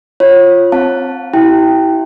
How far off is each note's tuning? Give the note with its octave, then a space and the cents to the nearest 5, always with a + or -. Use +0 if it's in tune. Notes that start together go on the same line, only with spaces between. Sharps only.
F4 +0 C#5 -30
C4 +0 F5 +15 A5 +0
E4 -15 G4 -40 G5 +0